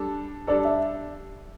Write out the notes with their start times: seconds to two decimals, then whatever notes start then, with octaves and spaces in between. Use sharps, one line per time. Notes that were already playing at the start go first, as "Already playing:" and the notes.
Already playing: G3 D4 A4
0.47 G3 D4 A4 D5
0.65 E5